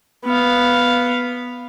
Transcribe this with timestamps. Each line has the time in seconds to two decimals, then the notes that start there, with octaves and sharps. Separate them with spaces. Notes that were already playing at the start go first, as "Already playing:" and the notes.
0.25 B3 F5